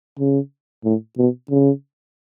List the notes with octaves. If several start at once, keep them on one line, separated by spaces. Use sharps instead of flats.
C#3
A2
B2
C#3